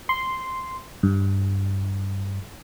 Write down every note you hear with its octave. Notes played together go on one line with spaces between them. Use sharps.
C6
G2